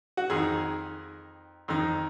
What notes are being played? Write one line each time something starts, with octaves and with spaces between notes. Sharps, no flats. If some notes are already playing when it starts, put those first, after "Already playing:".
F#4
F2 D#3 G#4
F2 D#3